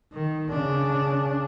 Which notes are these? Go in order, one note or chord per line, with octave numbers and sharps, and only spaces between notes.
D#3
C#3 D4